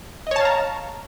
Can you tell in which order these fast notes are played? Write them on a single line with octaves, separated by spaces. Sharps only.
D#5 C#5 A5 F5 A#5